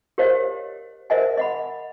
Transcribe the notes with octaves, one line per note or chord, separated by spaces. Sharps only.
G4 A#4 C5 C#5 D#5 F5
A#4 C5 D#5 E5 F#5 G#5
D#5 F#5 B5